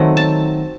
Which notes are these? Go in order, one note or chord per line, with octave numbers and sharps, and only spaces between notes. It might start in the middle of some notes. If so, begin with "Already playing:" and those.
Already playing: D#3 F#3 A3 C4
A5